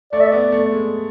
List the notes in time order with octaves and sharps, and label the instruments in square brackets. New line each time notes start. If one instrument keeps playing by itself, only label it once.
[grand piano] A3 [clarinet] D5
[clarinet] E5
[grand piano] B3 [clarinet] D5
[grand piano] A3
G#3